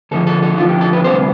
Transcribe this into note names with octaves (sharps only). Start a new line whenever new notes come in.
D2 D3 F3 A4
A4
A4
D2 D3 F3 F4
G4
A4
B4
D2 C3 G3 B3 C5